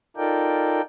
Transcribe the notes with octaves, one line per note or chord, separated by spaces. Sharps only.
D#4 F4 A4 A#4 D5 G5